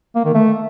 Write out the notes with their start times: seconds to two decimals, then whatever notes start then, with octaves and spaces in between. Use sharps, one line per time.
0.15 A#3
0.25 D#3
0.34 A3